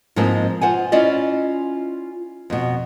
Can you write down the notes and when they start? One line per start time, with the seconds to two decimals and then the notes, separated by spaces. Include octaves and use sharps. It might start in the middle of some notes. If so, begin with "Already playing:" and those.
0.16 G#2 F3 G#3 A#3 C4 D#4
0.61 F4 C5 F#5 G#5
0.92 C#4 E4 F4 D5 D#5
2.50 F2 B2